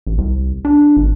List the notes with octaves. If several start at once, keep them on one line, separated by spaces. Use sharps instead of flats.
A1
C2
D4
G#1